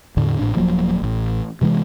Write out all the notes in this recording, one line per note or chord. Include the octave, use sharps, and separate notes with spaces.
E2 A2 D3
A1 A2 D4
D#1 F3 F#3 A#3
A1 A2
C3 E3 F#3 G#3